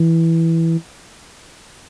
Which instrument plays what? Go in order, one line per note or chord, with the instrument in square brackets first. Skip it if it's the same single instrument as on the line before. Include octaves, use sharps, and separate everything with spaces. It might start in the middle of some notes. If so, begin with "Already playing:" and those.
Already playing: [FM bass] E3